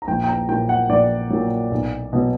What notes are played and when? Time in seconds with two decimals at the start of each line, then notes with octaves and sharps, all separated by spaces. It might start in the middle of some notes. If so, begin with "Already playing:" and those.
0.02 A#5
0.08 A#1 G5
0.24 G5
0.28 A#5
0.48 A#2 F#3 G5
0.69 F#5
0.89 A#1 D5
1.30 A#2 F#3
1.72 B1
2.13 B2 F#3